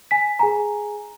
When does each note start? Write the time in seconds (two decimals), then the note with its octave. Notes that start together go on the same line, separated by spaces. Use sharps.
0.11 G#5 B6
0.39 G#4 G#5 A#5